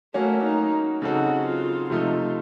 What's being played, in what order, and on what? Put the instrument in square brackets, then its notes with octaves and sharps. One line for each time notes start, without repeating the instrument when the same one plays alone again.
[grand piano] F#3 A#3 C#4 F#4 [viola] A3
[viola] D#4
[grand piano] C#3 F#3 C4 D#4 A4 [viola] F#4
[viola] F4
[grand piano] C3 F3 A3 D#4 [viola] F4